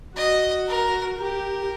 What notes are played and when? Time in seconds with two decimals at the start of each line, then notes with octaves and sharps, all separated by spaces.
0.16 F#4 D#5
0.68 A#4
1.18 G4 A#4